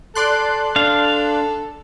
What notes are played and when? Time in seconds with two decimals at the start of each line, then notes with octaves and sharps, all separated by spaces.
0.15 A4 D5 C6 F#6
0.76 D4 A4 F5